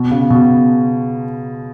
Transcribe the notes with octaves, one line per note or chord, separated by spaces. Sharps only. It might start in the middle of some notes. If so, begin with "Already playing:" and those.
Already playing: B2
C#3
B2